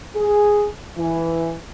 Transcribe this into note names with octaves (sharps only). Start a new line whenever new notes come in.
G#4
E3